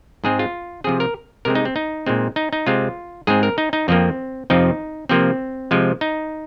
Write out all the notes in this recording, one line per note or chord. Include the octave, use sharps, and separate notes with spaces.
G#2 G#3 C4 G#4
F4
C3 F3 C4 G#4
A#4
C3 G#3 C4 A#4
D#4
C4
D#4
A#2 G#3 C4
D#4
D#4
C3 G#3 C4 F4
G#2 G#3 C4 G#4
A#4
D#4
D#4
F2 F3 A#3 C4
F2 C3 F3 C4 D#4
C3 F3 A#3 C4
C3 F3 G#3
D#4